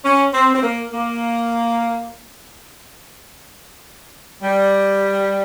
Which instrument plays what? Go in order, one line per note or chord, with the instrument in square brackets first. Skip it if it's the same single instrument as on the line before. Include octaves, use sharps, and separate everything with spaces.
[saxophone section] C#4
C4
C4
A#3
A#3
G3